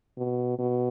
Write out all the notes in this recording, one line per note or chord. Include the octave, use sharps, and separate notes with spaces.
B2
B2